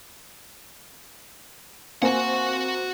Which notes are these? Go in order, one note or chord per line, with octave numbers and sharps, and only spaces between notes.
A#3 C4 F#4 F#5 G#5